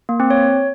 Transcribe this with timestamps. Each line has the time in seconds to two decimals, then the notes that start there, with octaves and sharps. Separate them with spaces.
0.09 A#3
0.20 C4
0.30 C#5